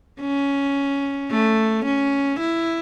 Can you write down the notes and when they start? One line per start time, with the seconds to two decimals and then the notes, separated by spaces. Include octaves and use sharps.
0.21 C#4
1.31 A3
1.85 C#4
2.40 E4